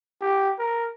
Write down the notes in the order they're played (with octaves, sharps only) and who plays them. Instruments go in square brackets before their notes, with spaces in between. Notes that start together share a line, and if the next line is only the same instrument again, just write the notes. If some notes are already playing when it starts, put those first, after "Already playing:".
[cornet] G4
A#4